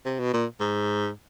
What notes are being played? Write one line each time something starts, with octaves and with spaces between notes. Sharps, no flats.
C3
B2
A#2
G#2